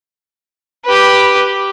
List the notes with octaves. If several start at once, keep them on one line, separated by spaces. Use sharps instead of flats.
G4 B4